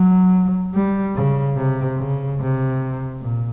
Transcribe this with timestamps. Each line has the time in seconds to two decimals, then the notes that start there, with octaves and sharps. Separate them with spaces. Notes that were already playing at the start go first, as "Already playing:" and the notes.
Already playing: F#3
0.74 G3
1.16 C#3
1.57 C3
1.98 C#3
2.39 C3
3.22 A#2